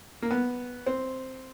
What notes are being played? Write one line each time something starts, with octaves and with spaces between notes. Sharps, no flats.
A#3
B3
C4